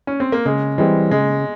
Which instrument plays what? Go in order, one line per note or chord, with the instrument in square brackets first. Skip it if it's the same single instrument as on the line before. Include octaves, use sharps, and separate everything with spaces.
[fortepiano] C#4
C4
A#3
[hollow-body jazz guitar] C#3 [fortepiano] G#3
[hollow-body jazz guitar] E3 G3 C4 [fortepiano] G#3
[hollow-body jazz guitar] C#3 [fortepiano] G#3